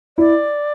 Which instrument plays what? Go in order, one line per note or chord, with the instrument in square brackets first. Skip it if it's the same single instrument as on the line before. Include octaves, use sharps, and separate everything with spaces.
[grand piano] E4 [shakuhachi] D5